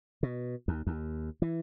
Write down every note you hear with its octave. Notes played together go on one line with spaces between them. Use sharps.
B2
D#2
D#2
E3